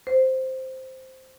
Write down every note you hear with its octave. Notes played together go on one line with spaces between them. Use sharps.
C5